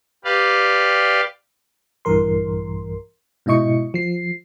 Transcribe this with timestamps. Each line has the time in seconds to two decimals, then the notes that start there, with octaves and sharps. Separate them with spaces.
0.24 G4 B4 D5 F5
2.05 A#1 G2 E3 A#4 C6
3.46 G#2 B2 E4 D#5 C#6 C#7
3.94 F3 C7